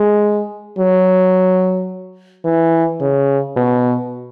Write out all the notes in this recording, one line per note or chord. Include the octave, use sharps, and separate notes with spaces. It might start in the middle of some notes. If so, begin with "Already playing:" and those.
Already playing: G#3
F#3
E3
C#3
B2